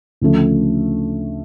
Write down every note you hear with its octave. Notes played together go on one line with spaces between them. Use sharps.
D2 C#3 F3 A3 C#4